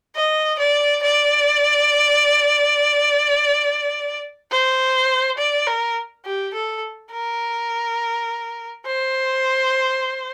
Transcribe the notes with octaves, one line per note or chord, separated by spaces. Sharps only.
D#5
D5
D5
C5
D5
A#4
G4
A4
A#4
C5